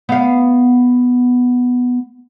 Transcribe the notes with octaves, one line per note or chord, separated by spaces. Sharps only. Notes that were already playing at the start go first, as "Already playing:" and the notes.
B3 F5